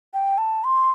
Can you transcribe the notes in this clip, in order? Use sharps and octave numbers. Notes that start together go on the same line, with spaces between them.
G5
A5
C6